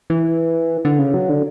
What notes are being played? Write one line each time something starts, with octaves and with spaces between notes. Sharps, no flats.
E3
D3
C#3
F#3
D3